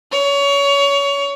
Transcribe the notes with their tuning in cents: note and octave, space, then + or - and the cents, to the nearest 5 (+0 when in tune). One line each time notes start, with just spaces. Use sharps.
C#5 +25